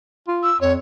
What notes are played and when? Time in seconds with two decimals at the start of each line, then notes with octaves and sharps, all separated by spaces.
0.28 F4
0.43 E6
0.61 F2 C#5